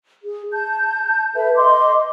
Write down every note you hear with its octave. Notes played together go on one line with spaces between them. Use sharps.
G#4
A5 G6
A4 B4 E5
D#5 C6 D6